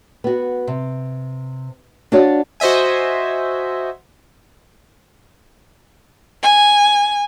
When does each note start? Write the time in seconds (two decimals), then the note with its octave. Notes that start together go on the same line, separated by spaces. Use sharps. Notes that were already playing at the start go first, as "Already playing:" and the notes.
0.24 B3 F#4
0.67 C3
2.12 D4 F4 F#4 C#5 D5
2.60 F#4 C5 D#5 E5 G#5
6.43 G#5